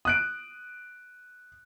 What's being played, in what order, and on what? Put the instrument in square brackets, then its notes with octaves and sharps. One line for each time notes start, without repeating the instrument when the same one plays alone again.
[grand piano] D#6 F#6 D7